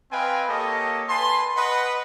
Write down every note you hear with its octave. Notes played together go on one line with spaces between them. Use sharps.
C4 B4 D#5 F5 G5 G#5
A#3 G4 A4 C#5 D#5
B4 G#5 A5 C6
B4 D#5 F#5